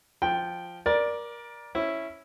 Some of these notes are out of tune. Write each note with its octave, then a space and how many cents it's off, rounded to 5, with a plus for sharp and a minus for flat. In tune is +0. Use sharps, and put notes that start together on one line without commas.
F3 +0 G5 +0
A#4 +25 D5 +0
C#4 -10 E4 +0